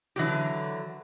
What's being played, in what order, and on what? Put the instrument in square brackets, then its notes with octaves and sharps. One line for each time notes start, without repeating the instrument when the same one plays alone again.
[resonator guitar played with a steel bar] D3 E3 F#3 G4